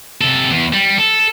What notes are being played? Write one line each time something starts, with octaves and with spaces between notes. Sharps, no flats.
C3 A4
E2
G3
A4